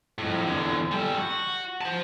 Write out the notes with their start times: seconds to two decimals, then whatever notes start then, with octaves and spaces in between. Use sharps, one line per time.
0.18 F2 A2
0.45 E2 D3
0.91 G3 A4
1.18 F#4
1.81 C5 A5